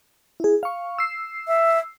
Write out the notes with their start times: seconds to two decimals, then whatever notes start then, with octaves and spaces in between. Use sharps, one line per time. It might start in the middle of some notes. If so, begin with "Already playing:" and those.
0.40 E4 G#4
0.63 F5 C#6
0.98 E6 C7
1.48 E5